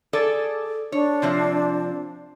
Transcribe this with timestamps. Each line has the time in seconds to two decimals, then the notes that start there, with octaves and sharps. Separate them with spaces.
0.13 G#4 A4 D5
0.92 D4 C#5
1.22 C3 F3 C4